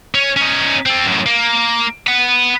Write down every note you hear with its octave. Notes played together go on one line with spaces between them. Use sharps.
C#4
C#4 D#4
C4 A4
F#2 A2
A#3
F#5 B5